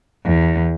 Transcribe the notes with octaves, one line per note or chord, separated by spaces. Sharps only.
E2